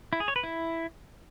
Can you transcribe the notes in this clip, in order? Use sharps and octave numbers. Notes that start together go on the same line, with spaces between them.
E4
G#4
C#5
B4
E4